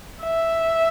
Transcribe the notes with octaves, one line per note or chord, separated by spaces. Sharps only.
E5